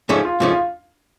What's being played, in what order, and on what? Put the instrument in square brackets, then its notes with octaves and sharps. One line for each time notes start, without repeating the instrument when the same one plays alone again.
[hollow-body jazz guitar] G#2 F3 A3 C#4 [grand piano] G#4
[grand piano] F4
[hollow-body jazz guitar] G#2 F3 A3 C#4 [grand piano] F4
[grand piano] F4